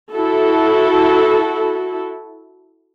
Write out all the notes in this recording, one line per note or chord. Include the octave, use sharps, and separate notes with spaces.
E4 F#4 A4